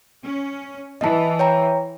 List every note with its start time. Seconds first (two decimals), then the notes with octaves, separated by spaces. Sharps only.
0.22 C#4
1.01 E3 D#5 A5
1.39 C#5 G5 A#5